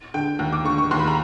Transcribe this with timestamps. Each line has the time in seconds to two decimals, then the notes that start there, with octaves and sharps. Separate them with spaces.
0.14 D3 G5
0.39 D#2
0.53 D6
0.65 D3 C#6
0.78 C#6
0.91 D#2 C6
0.99 B5
1.08 A#5